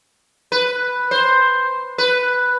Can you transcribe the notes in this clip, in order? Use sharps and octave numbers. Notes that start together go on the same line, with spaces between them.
B4
C5
B4